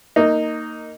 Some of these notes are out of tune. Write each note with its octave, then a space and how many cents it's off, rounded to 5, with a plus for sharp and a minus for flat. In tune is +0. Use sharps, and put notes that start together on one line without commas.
A#3 -15 D#4 +0